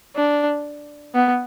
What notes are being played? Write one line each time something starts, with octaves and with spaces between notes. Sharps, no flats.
D4
B3